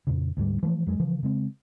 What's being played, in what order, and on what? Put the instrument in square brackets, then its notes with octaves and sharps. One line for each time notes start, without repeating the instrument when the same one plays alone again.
[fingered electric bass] F2 A#2 C#3
D2 G#2 G3
E3 F3 G#3 A3
F2 F#3 G#3
C#3 E3 F3
C#3 G#3 C4